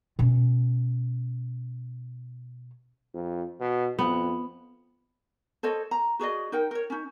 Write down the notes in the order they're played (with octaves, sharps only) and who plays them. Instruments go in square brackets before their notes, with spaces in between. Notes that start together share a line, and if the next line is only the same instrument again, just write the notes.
[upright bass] B2 C#4
[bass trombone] F2
B2
[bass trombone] F2 [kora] B3
[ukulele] A4 C5 C#5 D#5
A#5
F#4 G#4 D5 D#5
D#4 A#4 G5
A#4 C#5
C#4 D#4